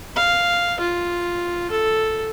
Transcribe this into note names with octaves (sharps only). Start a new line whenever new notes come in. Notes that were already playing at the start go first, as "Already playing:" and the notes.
F5
F4
A4